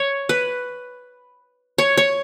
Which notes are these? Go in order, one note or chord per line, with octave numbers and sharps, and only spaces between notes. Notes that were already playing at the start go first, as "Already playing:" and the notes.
Already playing: C#5
B4
C#5
C#5